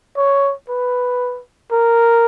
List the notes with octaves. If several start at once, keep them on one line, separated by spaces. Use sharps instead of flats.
C#5
B4
A#4